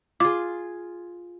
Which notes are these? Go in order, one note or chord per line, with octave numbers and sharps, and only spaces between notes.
F4 G#4 D6